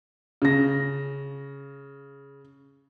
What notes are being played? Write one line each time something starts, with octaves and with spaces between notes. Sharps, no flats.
C#3 A#6